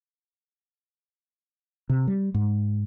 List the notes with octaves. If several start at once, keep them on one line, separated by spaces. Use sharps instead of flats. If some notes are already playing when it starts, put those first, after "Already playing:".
C3
G3
G#2